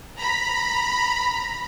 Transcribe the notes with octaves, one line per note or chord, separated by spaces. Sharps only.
A#5 B5